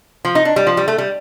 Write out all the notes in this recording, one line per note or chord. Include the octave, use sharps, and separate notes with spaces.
F3
D#4
D4
G3
F3
G3
A3
G3